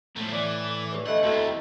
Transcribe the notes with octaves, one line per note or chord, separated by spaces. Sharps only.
A2 F3 A3
E3 D5
G4 B4 C#5
D3 A3 D#5 F#5 B5
D#2 A3 C4 E4 F#4 A5